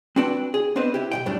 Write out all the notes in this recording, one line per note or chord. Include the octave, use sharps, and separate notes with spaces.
C4 D4 F#4 B4 G5 A5
G#4
B3 C4 D4 B4 C5 D#5
E4 G4
B1 A#2 G5
F#2 A2 F#3 G3 D4